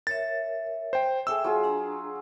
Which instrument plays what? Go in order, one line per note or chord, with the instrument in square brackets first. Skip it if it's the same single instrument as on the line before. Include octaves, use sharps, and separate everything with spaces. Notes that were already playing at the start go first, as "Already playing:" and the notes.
[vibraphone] A#4 C#5 E5 [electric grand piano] A6
[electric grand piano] C5 G5
[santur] G#4 A4 D6 [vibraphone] E5 G5 [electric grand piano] E6
[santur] F#3 F4 G#4
[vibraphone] D4 A#5